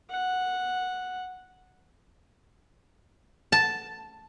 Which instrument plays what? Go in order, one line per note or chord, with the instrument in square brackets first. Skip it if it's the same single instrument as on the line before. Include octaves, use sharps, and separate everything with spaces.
[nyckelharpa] F#5
[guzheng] A5